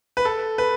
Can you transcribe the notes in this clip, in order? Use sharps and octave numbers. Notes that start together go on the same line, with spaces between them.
B4
A4
B4